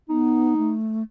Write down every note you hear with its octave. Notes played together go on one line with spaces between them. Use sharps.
B3 D#4
A3